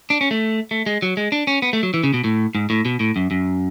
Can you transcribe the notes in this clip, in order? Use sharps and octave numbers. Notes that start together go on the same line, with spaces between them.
D4
C#4
A3
A3
G#3
F#3
G#3
D4
C#4
B3
A3
F#3
E3
C#3
B2
A2
G#2
A2
B2
A2
F#2
F#2